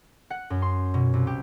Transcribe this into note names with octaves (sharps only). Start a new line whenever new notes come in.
F#5
F#2
C6
B2
C2
G4